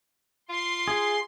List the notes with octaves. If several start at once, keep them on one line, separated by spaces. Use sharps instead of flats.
F4 C6
G#4